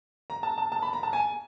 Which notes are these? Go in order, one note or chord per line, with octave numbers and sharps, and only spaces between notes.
A#5
A5
A5
A5
B5
A#5
A5
G#5